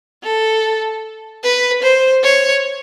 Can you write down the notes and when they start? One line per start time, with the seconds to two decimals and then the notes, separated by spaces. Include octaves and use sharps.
0.23 A4
1.43 B4
1.83 C5
2.23 C#5